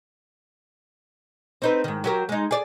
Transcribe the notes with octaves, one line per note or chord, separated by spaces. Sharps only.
C4 D#4 B4
G#2 D#3
F#3 G4 A#4
G#3 D#4
G#4 D5